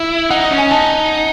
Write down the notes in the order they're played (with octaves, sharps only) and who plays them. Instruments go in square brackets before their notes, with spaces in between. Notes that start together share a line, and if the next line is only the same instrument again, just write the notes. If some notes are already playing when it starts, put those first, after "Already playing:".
Already playing: [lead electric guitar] E4
[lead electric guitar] D#4 [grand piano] F#5
[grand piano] D#5
[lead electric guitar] C#4
[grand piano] G#5
[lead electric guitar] D#4 [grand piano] A5